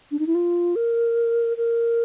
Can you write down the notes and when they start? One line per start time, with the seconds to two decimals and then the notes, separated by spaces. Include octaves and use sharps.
0.11 D4
0.19 D#4
0.27 E4
0.35 F4
0.76 A#4
1.57 A#4